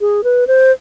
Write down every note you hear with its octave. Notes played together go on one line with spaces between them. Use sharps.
G#4
B4
C5